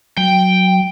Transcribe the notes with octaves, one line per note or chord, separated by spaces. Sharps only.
F#3 G5